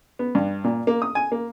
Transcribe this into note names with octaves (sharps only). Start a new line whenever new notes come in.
B3
G2
A#2
A#3
D#6
G#5
A#3